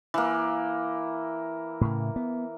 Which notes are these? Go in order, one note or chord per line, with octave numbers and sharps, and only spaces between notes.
E3 A#3
A2 C#3
B3